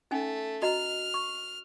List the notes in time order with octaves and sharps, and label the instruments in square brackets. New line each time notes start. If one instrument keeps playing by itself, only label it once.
[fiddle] A3 [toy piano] C#4 D#4 G#5
[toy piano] F#4 D#5 A#5 [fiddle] F6
[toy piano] C#6